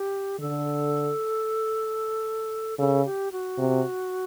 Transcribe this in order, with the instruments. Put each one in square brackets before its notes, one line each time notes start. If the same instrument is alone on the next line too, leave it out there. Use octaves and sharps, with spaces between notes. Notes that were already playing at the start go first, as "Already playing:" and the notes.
Already playing: [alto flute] G4
[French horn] D3 [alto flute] A4
[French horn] C#3 [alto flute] A4
[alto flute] G4
F#4
[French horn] C3